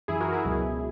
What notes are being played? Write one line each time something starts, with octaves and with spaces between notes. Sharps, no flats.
F#2 E3 E4 G#4
F#4 A#4
E4 G#4
C#2 B2 F#3